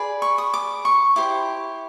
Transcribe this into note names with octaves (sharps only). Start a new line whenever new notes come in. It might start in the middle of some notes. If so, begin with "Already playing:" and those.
Already playing: G#4 B4 D5
C#6
D#6
D6
C#6
E4 G4 C5 D6